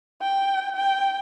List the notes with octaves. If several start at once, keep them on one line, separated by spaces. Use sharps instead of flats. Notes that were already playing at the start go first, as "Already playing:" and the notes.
G5
G5